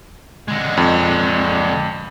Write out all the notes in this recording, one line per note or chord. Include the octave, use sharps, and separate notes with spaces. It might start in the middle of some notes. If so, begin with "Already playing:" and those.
D3 G#3
F2